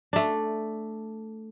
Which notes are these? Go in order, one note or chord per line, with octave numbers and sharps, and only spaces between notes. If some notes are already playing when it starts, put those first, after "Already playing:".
A3 D4